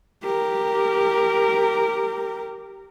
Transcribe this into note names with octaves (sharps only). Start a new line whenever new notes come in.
G4 A#4